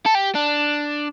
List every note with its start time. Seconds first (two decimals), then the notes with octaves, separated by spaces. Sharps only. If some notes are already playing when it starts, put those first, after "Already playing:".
0.06 A4
0.15 G4
0.35 D4